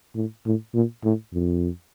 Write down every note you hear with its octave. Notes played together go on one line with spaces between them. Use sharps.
A2
A2
A#2
A2
F2